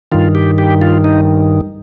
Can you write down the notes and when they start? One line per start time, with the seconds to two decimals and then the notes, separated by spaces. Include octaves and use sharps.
0.12 G2 D#3 F4
0.35 G4
0.58 G4
0.81 F4
1.04 D#4